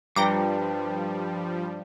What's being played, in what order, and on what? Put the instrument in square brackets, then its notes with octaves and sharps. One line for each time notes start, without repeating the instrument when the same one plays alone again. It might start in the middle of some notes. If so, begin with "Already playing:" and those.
[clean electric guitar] G2 [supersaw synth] F3 G3 [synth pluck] G5 A#5 D6